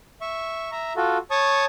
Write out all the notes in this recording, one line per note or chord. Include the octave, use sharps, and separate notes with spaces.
E5 C#6
E5 A#5
F4 F#4 A4
C#5 A5 C#6 D#6